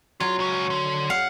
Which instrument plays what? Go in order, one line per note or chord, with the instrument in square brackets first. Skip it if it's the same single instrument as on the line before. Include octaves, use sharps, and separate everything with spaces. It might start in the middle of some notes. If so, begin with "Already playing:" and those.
[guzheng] F#3 [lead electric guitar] F4
[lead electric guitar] C#2 C#4
D3
[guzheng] F5 [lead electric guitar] F#5